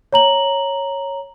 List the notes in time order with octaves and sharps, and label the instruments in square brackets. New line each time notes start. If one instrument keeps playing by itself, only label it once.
[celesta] C#5 A#5 F#7